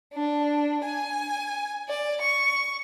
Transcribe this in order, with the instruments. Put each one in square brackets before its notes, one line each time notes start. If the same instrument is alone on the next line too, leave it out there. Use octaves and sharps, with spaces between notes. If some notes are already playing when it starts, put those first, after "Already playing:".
[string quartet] D4
G#5
D5
C#6